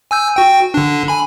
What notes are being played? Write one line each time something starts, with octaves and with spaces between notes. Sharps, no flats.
G#5 E6 G6
F#4 G5
D3 D4
G#5 B5